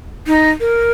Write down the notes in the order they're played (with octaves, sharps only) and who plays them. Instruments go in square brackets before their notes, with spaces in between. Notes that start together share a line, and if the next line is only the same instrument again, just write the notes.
[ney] D#4
A#4